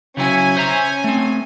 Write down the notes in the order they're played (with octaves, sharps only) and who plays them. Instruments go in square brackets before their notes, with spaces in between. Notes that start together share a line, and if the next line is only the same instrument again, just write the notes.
[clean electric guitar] C#3 F#3 E4 [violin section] C#4 G#5
[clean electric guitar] C5 E5 A#5
A3 C4